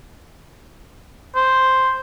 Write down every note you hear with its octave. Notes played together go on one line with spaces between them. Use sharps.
C5